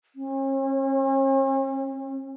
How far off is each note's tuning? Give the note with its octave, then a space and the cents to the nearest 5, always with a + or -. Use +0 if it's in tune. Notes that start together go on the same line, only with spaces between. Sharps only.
C#4 -45